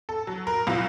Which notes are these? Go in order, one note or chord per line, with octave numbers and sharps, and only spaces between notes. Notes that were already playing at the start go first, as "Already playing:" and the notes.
A4
F#3
A#4
C2 F#3 F4